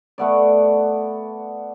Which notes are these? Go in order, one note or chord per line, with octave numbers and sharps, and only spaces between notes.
A3 B3 D5